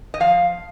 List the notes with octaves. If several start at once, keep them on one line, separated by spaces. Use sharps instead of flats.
D#5
F3 F5